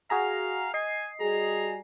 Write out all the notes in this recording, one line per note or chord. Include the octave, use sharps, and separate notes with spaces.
F#4 G#4 F5 A#5
D#5 G#5 C7
G3 F#4 G#4 A#5